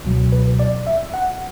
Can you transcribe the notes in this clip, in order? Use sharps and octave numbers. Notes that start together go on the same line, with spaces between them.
C#2 B2 F#3
B4
D5
E5
F#5